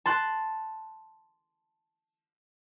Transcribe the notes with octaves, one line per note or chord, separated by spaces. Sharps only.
A5 C6 F#6